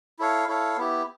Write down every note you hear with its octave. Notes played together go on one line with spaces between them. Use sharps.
E4 A4 C#5 F5
E4 A4 C#5 F5
B3 E4 G4